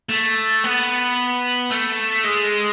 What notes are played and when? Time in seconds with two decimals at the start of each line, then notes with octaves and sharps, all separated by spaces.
0.09 A3
0.64 B3
1.71 A3
2.24 G#3